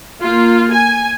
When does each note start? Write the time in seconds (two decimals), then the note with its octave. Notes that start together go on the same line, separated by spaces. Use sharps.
0.21 A#3 F4
0.73 G#5